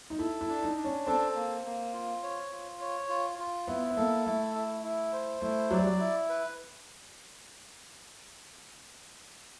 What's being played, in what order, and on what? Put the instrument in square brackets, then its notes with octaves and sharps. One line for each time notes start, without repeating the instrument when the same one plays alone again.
[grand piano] D#4
[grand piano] E4 [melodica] A4
[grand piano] E4
[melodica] D4
[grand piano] D#4
[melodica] D4
[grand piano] C#4
[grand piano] C4 [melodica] A4
[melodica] A#3
A#3
F4
C#5
F4
C#5
F4
F4
[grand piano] B3 [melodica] E4
[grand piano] B3
[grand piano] A#3 [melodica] A4
[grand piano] A3 [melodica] E4
[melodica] E4
E4
C5
[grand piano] A3 [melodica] E4
[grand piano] F#3 [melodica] D5
[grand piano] G3
F#3
[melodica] E4
B4